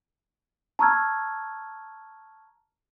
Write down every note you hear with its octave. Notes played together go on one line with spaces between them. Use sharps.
A5 A#5 C#6 E6 F6 G#6